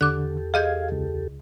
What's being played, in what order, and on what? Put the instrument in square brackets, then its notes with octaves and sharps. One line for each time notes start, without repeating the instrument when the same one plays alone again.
[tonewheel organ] E2 G4 A4 [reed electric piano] D3 [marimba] D6 F#6
[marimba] G#4 D#5 G6 [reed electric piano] F5 G#6
[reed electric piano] C#2